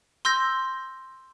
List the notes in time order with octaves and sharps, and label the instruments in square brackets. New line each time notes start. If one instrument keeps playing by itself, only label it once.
[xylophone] C6 E6 G6 A#6